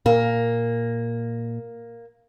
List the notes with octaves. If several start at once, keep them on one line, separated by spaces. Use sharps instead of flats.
A#2 A#3